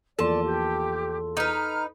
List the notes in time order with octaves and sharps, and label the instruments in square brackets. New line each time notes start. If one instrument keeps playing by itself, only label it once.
[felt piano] E2 F3 A#3 [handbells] A4 C6 [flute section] D5 [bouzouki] A5
[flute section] G4
[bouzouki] D#4 B4 [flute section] A#5 F6